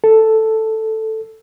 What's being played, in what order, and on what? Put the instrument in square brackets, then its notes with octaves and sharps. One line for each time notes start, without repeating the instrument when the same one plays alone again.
[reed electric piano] A4